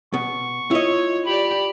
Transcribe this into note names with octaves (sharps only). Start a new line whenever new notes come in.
B2 C#6
E4 F4 C#5 D#5
G4 D5 B5